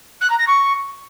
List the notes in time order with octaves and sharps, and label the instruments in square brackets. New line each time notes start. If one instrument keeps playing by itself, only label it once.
[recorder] F#6
A#5
A#6
C#6